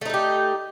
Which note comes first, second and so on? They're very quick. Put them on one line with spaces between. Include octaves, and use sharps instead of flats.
A3 D#4 A4 G4